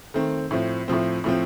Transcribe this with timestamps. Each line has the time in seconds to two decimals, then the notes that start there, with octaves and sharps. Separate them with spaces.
0.14 D#3 A3 C4
0.51 A2 F3 C4
0.88 A2 F3 C4
1.24 A2 F3 C4